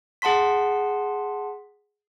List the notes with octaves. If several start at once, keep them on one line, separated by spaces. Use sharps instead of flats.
G#4 F#5 A5 C6 B6